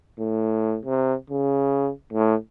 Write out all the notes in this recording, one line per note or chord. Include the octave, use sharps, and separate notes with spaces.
A2
C3
C#3
A2